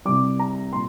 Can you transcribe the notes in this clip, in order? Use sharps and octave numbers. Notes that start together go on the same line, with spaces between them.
C2 C3 G3 D6
A#5
A#2 G3 C6